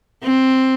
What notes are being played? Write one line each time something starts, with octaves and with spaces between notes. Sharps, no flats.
C4